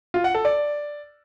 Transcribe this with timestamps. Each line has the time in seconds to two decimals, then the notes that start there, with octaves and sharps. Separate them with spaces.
0.14 F4
0.24 F#5
0.34 A4
0.45 D5